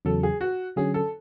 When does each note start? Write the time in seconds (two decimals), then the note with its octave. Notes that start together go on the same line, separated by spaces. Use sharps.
0.05 E2 C#3 F#3 A4
0.23 G#4
0.41 F#4
0.76 D3 F#3 C#4 G#4
0.94 A4